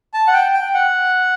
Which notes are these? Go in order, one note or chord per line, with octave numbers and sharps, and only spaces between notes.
A5
F#5
G5
G5
F#5